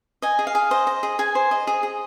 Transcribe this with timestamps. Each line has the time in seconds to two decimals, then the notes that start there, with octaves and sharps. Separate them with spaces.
0.22 D#5 G#5
0.39 G#4
0.47 F5
0.55 G#4
0.71 C5 D#5
0.87 D#5
1.03 G#4
1.19 G#4 G#5
1.35 C5
1.51 D#5
1.67 G#4
1.83 G#4